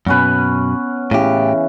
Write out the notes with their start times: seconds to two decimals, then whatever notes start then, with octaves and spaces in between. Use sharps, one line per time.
0.07 F#2 B2 B3 C#4 B4
1.11 A2 C#3 E3 G4